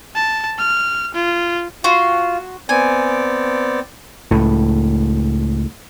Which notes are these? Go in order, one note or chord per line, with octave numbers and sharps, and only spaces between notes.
A5
F6
F4
F4 F#4 C6
B3 C4 D5 G#5
C#2 A2